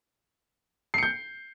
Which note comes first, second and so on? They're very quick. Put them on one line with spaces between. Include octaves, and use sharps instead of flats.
C7 C#7 G6